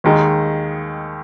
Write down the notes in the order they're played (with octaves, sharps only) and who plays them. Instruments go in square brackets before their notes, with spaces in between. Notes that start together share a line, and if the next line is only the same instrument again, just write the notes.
[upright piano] D#2 D#3 G#3